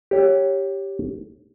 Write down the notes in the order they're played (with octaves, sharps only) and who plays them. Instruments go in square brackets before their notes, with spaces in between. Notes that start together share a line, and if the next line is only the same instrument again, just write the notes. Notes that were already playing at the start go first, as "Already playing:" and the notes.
[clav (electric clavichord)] G4 C#5